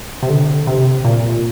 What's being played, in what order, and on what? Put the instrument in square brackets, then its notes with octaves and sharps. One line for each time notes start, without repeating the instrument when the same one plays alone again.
[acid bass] C3
D3
C3
A#2